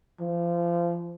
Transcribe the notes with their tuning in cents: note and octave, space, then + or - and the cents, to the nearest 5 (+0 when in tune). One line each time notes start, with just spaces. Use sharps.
F3 -25